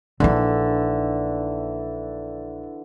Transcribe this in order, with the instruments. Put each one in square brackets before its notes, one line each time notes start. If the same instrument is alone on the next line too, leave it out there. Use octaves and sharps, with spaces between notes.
[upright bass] A#1 D#4 [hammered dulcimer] D3 E3